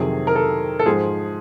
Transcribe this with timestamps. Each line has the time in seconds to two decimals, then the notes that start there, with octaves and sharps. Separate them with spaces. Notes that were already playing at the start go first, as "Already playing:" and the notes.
Already playing: F2 C3 D#3 F#3 G#4
0.27 A#4
0.36 A4
0.79 A4
0.86 G#2 F3 G#4